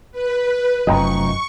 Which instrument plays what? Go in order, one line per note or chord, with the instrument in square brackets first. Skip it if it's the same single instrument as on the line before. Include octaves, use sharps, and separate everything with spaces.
[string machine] B4
[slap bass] F1 F#2 F3 [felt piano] D#5 G5 A#5 [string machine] C#6